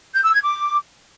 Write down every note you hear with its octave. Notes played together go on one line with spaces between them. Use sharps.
G6
E6
G#6
D6